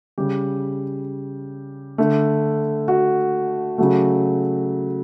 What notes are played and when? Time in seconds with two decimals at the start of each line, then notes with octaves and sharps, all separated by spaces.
0.18 C#3 G3 G4
1.98 D3 A3
2.88 F#4
3.78 C#3 F#3 A3 F#4